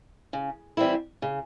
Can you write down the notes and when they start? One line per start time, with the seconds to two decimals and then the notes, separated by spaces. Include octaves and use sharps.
0.33 C#3
0.77 E3 G3 C4 E4
1.22 C#3